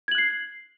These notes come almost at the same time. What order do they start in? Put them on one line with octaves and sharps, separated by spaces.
G#6 F#7 F#6 C7